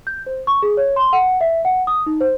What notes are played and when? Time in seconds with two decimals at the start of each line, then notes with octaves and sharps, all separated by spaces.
0.07 G6
0.26 C5
0.47 C#6
0.62 G#4
0.77 C#5
0.96 C6
1.13 F#5
1.41 E5
1.65 F#5
1.87 D#6
2.06 D#4
2.21 C5